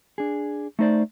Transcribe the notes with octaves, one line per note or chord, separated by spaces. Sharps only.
D4 G#4
A3 D#4 C5 D5